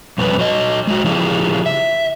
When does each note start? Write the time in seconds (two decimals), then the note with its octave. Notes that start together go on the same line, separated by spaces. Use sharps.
0.18 F2 B2 G3 C#4 B4
0.39 F#3 D#5
0.87 G#3 F#4
1.04 C#3 F3 E4 G4 G#4
1.66 E5